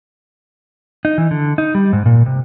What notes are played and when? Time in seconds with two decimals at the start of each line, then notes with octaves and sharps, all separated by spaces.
1.05 D#4
1.18 E3
1.31 D3
1.58 D#4
1.75 G3
1.93 G#2
2.06 A#2
2.26 C3